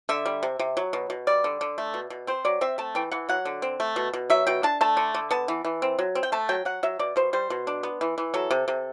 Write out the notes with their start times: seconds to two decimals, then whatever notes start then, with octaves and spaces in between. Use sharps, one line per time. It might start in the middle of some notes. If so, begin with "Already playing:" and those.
0.09 D3 E5
0.26 G3
0.43 C3
0.59 C3
0.77 F#3
0.93 B2
1.10 B2
1.27 G3 D5
1.44 D3
1.61 D3
1.78 A3
1.94 B2
2.10 B2
2.27 C4 C5
2.45 F#3 D5
2.61 C4 E5
2.78 A3 A5
2.95 E3 G5
3.11 E3 F#5
3.29 F#3 F#5
3.45 D3
3.62 C4
3.80 A3
3.96 B2
4.13 B2
4.30 F#3 E5
4.47 B2 G5
4.63 D4 A5
4.81 A3 A5
4.97 D3
5.14 D3
5.31 B3 A5
5.48 E3
5.65 E3
5.82 C4
5.99 F#3
6.15 C4
6.23 G5
6.32 A3 A5
6.49 F#3 G5
6.65 F#3 F#5
6.83 F#3 E5
6.99 B2 D5
7.16 B2 C5
7.33 G3 C5
7.50 B2
7.67 D4
7.83 B3
8.01 E3
8.18 E3
8.34 F#3 A4
8.51 C3
8.68 C3